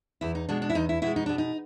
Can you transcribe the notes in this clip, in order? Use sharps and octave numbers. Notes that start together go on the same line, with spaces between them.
E2 E4
D#4
B2 G#3 D4
D4
E4
E2 D#4
E4
B2 G#3 E4
D#4
B2 D4
D#4